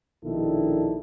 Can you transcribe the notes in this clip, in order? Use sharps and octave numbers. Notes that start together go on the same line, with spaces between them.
A#1 B2 D#3 D4 E4 A4